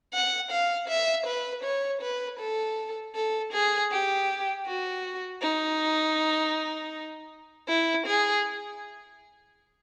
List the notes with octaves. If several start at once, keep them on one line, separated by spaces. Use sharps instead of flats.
F#5
F5
E5
B4
C#5
B4
A4
A4
G#4
G4
F#4
D#4
E4
G#4